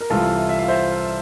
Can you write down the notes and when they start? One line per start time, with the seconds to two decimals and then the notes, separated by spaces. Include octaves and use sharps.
0.01 A#4
0.10 C2 C3 E3 F4 A4
0.49 E5
0.58 F5
0.68 C5 E5